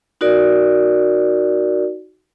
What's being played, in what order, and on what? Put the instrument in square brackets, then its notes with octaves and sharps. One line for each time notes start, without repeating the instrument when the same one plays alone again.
[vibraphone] D#4 F#4 A#4 D5